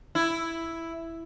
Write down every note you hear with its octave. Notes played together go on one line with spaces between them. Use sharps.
E4